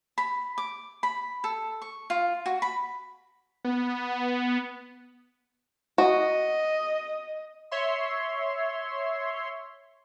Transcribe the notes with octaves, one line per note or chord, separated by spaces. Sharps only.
B5
D6
B5
A4
C#6
F4
F#4
B5
B3
F#4 D#5
C#5 E5 C6